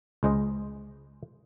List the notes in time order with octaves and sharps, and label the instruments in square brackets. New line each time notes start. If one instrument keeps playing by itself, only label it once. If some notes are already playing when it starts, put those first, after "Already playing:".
[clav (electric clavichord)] C#2 G#3 C5 D#5